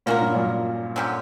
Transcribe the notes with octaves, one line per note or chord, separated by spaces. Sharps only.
A#2 A#3 C#4 F#4 A#4
G2
F#2 A#2
D3 F#3 C#4 G4